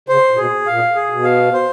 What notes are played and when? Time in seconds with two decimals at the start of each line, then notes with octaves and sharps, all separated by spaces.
0.09 C#3 C5
0.31 A#2
0.37 B2 G#4
0.67 A#2 F5
0.95 G#4
1.10 B2
1.24 F5
1.54 C5